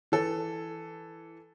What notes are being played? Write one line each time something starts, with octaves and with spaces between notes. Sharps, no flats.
E3 A4